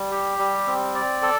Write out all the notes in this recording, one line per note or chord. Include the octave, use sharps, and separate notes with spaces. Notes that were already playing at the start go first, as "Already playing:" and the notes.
Already playing: G3
G4
G3
C4
D5
A4